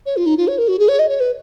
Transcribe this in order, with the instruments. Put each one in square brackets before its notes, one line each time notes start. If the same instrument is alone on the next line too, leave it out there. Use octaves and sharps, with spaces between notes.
[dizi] C#5
F4
D#4
F4
C#5
A#4
F#4
G#4
C#5
D#5
C#5
B4